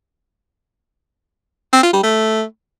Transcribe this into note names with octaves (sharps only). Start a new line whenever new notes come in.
C4
F4
G3
A3